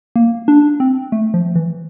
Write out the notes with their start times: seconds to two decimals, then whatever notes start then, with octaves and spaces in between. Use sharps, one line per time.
0.16 A#3
0.48 D4
0.80 C4
1.12 A3
1.34 F3
1.55 E3